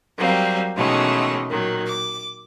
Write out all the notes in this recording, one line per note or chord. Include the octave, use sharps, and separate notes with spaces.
F#3 G3 A#3 C4
B2 D#3 E3 G#3 A3 C#4
A#2 D#3 F#3
D6